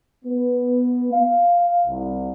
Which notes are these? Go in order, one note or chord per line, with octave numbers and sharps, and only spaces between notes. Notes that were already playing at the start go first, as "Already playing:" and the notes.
B3
F5
C2